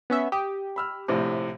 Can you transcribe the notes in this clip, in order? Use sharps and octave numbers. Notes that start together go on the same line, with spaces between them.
B3 C#4 E5
G4 D#6
B5 E6 F6
A#1 A2 C3